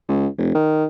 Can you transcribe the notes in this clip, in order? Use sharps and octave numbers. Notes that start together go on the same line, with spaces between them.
C#2
F1
D#3